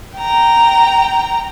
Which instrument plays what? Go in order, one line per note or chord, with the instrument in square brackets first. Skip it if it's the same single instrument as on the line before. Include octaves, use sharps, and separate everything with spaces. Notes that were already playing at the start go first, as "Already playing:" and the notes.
[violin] G5 A#5